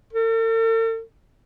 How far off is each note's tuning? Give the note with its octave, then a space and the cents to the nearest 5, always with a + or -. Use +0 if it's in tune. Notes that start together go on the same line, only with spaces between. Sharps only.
A4 +45